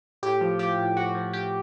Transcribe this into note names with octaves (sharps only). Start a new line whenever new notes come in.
A2 G4
F3
F3 G4
A2
A2 F#4
F3
F3 G4